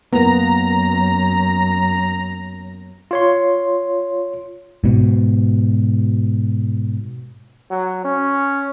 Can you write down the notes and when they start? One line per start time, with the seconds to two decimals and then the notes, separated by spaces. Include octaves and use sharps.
0.13 F#2 A#3 B3 A#5
3.11 F4 C#5 C6
4.84 G#2 B2
7.71 F#3
8.05 C#4